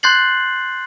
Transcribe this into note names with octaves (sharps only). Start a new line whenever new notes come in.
C6 F#6 G6 A6 C7 F#7